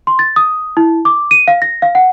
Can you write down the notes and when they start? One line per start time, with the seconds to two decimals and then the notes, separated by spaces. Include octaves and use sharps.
0.07 C6
0.19 A6
0.36 D#6
0.77 E4
1.05 D6
1.31 D#7
1.48 F5
1.62 A#6
1.82 F5
1.95 F#5